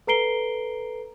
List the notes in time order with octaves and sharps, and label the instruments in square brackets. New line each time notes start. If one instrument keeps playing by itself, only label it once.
[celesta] A4 B4 A#5 C7 D7 G7